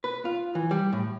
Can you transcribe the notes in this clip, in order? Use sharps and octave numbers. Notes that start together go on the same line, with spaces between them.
B4
F4
E3
G3
A2